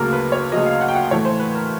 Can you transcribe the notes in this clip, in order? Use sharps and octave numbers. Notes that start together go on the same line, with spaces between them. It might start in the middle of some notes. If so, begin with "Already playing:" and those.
Already playing: D2 C#3 F#3 A#3 A#4
B4
C#5
D2 C#3 F#3 A#3 D#5
F5
F#5
G5
F#5
A2 E3 A3 C#5
C5
B4
A#4